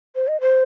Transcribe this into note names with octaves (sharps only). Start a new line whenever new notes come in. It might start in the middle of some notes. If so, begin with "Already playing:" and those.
C5
D#5
C5